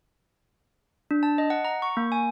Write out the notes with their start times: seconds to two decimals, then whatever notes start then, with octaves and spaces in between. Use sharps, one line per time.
1.11 D4
1.23 A5
1.38 D#5
1.50 F#5
1.65 A#5
1.82 C#6
1.97 A#3
2.12 G#5